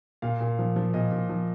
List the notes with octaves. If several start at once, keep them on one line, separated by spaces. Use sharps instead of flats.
A#2 F5
A#2
F3
F3
A#2 D#5
A#2
F3